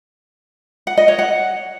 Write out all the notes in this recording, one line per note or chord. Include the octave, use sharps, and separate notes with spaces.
F#5
D#5
C#5
F#5